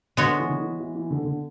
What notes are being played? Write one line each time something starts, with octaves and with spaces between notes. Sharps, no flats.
D3 G#3 B3 F#4 C#5
E3
D3
E3
E3
E3
D3
D3